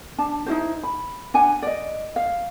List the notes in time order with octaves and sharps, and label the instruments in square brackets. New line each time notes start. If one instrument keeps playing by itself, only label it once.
[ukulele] D4 A5
D#4 E4 F#4 C5
B5
D4 F#5 G#5
D5 D#5
F5